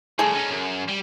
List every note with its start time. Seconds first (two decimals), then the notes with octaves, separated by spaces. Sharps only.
0.19 C2 A2 G#4 A4
0.35 C#4 D#4
0.51 F#2
0.88 G3